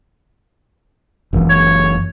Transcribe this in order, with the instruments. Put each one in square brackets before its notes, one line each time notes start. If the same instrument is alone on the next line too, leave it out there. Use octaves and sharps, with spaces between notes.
[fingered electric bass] F#1 F#2 E3
[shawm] C#5